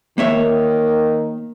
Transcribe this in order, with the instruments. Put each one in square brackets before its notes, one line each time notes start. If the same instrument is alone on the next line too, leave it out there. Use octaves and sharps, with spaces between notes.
[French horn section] D#3 [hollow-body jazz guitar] A#3 C#5 E5